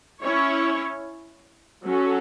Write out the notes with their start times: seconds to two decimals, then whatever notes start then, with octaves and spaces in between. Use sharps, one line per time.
0.22 C#4 E4 C#5
1.85 F#3 C#4 F#4 A4